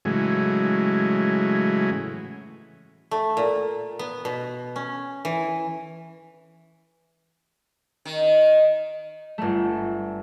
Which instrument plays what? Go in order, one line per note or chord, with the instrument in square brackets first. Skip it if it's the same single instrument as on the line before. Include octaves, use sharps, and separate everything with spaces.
[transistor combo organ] A2 C#3 E3 F#3 G#3
[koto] A3
A#2
B3
B2
C#4
E3
[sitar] D#3
[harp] G1 A3